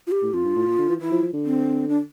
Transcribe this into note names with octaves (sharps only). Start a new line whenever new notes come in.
F4
G4
A2
F2 F4
G2
A2
A#2
D3
E3
E3 E4
F3
F3
D3
C4
D4